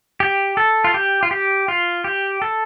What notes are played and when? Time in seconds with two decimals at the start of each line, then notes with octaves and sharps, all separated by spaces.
0.20 G4
0.57 A4
0.84 F4
0.94 G4
1.23 F4
1.31 G4
1.68 F4
2.04 G4
2.42 A4